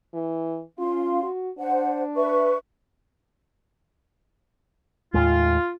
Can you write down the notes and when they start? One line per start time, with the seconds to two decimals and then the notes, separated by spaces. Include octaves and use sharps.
0.14 E3
0.79 C#4 F4 F5 C6
1.23 F#4
1.58 D4 C5 F#5
2.17 B4 E5 C#6
5.14 D#2 A2 G#3 F4